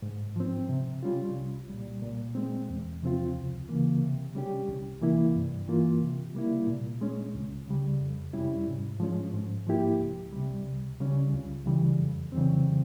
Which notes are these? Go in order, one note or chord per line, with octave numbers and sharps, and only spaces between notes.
G#2
F3 C4
C3
G3 C#4 F4
C2
A#2 G3
A#2
G#3 C4
E2
C3 F3 C4 F4
C#2
C#3 E3 A#3
C3
G3 C#4 G4
C2
C3 E3 A#3 E4
G2
E3 A#3 F4
C3
G3 A#3 E4
A#2
G#3 C#4
C#2
C#3 G3
F2
C3 G3 C#4 E4
G#2
F3 G#3 C#4
G#2
F3 A#3 E4 G4
C2
C3 G3
C#2
C#3 G3 C#4
C#2
C#3 E3 G3
F2
C#3 E3 G3 C4